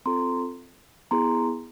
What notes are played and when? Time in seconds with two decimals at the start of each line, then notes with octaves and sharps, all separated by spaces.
0.06 C4 F4 A4 A#5 C6
1.11 B3 E4 G#4 A#5 C6